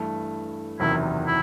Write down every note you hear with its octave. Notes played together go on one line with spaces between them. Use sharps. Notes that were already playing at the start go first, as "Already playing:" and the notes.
Already playing: G2 E3 A3
F#1 E2 C3 D#3 F#3 E4
E4